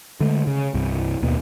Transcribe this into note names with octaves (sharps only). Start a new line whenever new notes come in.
D3 G#3 A3
C#3
C2 G2
D#2 B2